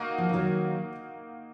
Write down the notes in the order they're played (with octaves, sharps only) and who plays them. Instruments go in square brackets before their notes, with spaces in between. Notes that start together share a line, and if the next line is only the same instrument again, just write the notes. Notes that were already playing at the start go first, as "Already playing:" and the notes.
Already playing: [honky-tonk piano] A#3 D#4 F#4
[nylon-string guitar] F3
F3
D#3 F#3